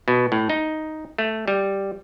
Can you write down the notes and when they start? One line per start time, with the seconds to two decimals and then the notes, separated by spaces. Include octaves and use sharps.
0.08 B2
0.32 A2
0.50 D#4
1.18 A3
1.48 G3